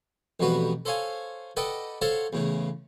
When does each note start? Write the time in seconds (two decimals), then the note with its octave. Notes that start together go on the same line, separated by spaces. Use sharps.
0.40 A1 F2 B2 G3 F#4 B4
0.85 A4 C5 C#5 F5 G#5
1.57 A4 B4 D5 D#5 F#5 G5
2.01 A4 C5 C#5 F5 F#5 A5
2.33 E2 A2 C#3